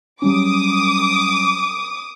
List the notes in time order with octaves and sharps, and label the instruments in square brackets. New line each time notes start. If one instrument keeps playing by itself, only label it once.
[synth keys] F#3 G3 C#4 [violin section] D6 D#6